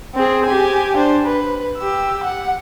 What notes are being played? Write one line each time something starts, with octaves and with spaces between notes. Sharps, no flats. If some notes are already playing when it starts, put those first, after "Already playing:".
C4 G#4
G4 G#5
D4 C5
B4
G4 E6
F#5